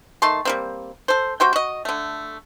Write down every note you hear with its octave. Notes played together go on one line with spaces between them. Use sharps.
D#3 A3 A5 C6
G3 A#3 C4
A4 C5
C3 F#4 C5 G5
F#4 D#5
D3 A3